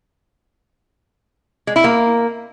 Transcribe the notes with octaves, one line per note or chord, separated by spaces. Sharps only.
G#3
E4
A#3